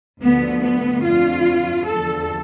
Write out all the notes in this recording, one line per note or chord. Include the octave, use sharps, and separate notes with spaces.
D2 D3 F3 B3
B3
F2 D3 F3 F4
E2 D3 F3 A4